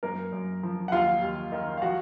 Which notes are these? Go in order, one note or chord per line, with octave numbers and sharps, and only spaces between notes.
F#2 A#3 A#4
F#2
F3
F#5
D#2 F4 F5
D#2
D#3
F5
F3 F#4 F#5